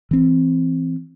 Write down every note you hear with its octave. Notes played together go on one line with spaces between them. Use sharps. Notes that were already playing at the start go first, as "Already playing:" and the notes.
E3 C4